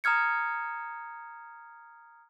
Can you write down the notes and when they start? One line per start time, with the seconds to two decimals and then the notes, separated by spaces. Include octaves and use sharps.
0.04 A#5 D#6 F6 G#6 C#7